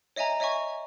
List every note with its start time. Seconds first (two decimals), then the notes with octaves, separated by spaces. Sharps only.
0.16 C#5 D#5 E5 G#5 A#5
0.40 C#5 D#5 E5 G#5 C#6